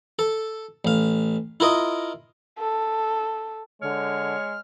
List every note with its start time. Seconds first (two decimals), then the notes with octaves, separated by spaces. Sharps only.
0.19 A4
0.85 A1 F5
1.60 E4 F4 A#4 D#5
2.59 A4
3.82 D3 G#3 C#5 F6